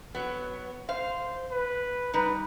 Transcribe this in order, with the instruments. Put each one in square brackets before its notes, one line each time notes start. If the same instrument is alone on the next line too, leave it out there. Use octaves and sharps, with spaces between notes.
[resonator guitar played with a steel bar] F#3 B3
[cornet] C5 [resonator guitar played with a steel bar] F5
[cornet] B4
[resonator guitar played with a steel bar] G3 D#4 [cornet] B4